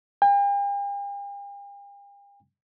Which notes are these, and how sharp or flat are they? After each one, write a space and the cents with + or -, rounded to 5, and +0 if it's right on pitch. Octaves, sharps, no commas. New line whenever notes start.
G5 +45